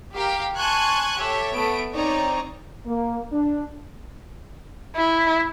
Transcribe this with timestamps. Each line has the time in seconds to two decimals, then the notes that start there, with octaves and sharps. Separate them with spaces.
0.13 G4 A#4 F5 G5
0.58 G#5 A5 C6 C#6 F#6 G#6
1.18 G4 A4 C#5 E5
1.55 A3 B3 D7
1.93 C4 D#4 C#5 D5 A#5
2.84 A#3
3.30 D4
4.96 E4